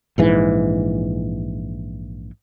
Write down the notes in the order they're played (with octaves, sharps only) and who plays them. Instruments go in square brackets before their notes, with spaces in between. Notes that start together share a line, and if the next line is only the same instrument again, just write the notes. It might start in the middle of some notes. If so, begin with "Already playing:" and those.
[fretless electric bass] A#1 G#2 E3